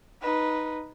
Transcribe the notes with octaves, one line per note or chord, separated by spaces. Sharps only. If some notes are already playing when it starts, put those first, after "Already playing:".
D#4 B4